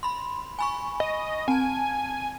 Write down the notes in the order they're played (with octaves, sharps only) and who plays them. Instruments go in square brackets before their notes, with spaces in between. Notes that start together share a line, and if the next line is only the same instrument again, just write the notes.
[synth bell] B5 C6
G#5 B5 C#6
[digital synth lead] D#5
[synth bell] C4 A5 [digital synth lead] G#5